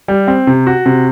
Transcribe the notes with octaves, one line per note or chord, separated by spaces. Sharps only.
G3
C4
C3
F#4
C3